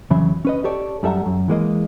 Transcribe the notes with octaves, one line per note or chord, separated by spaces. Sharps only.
F2 C#3 E3 F#3 E5 B5
C#4 B4 D#5
G4 A4 C#5 D5
F#2 G3 A4 E5 F#5 A#5
F#2
E3 G#3 A#3 D#5